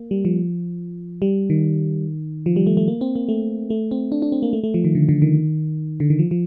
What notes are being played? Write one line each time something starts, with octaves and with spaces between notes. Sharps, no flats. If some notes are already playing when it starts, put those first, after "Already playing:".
Already playing: A#3
G3
F3
G3
D#3
F3
G3
A3
A3
A#3
C4
A#3
A3
A3
C4
D4
D4
C4
A#3
A3
A3
F3
D#3
D3
D3
D#3
D3
D#3
F3
F3